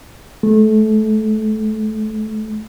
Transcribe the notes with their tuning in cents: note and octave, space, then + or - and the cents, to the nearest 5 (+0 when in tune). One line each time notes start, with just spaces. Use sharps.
A3 -25